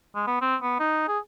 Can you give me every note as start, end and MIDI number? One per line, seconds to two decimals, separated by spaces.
0.15 0.23 56
0.27 0.39 59
0.41 0.56 60
0.62 0.76 59
0.79 1.05 63
1.08 1.19 68